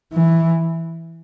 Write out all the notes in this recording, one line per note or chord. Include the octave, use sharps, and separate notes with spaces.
E3